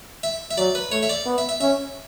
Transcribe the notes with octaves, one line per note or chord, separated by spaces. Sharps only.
E5
E5
F#3 D5
B4
A3 C#5
E5
D5
B3
E5
E5
C#4 E5